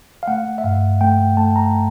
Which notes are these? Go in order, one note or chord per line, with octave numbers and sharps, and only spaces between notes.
F5
A3 F#5
E5
G2 F5
A3 G5
A3 A5
A#5